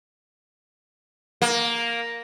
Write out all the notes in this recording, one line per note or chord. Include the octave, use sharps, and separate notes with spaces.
A#3